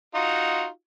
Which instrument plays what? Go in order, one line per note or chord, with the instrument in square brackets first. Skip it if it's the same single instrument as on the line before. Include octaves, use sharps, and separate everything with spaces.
[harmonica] D#4 F4 F#4